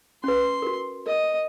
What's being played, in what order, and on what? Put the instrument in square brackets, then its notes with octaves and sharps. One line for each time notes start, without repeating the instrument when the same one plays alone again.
[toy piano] C#4 B4 [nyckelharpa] C6
[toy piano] F#4 A#4
[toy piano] A#4 [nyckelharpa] D#5